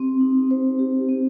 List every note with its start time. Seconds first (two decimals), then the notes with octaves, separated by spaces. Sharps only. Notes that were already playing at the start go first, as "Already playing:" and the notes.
Already playing: C4 G4
0.21 D#4
0.51 C5
0.79 G4
1.09 C4